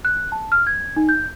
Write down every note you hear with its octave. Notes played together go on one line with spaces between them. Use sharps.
F#6
A5
F6
G#6
D#4
G6